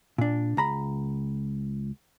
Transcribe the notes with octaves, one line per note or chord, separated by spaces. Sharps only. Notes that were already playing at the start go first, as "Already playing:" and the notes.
A#2 D4
C#2 A#5 B5